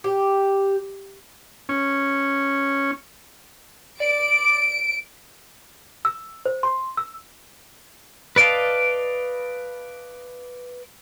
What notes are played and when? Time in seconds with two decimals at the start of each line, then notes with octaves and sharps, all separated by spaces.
0.04 G4
1.69 C#4
4.00 D5 D7
6.05 E6
6.46 C5
6.63 C6
6.97 E6
8.36 B4 D5 D#5 F5 A5